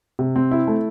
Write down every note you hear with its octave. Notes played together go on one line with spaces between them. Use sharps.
C3
C4
E4
A3